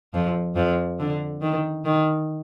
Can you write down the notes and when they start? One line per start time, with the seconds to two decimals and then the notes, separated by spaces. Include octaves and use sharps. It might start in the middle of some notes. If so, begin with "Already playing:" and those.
0.14 F2 F3
0.56 F2 F3
0.99 D3
1.42 D#3
1.85 D#3